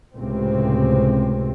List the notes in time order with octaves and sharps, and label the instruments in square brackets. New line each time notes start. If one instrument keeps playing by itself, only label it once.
[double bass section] C#2 A2 C3 C4